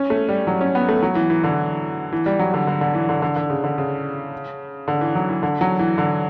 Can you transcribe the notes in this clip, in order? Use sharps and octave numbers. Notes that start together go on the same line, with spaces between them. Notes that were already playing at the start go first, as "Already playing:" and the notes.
Already playing: C#4
A3
G3
F#3
C#4
B3
A3
F#3
E3
E3
D3
E3
G3
F#3
D3
D3
D3
E3
D3
D3
D3
C#3
D3
C#3
D3
E3
F#3
E3
D3
F#3
E3
D3